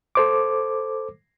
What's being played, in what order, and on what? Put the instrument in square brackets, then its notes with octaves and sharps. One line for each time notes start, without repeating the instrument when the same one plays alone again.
[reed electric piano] A4 C5 D6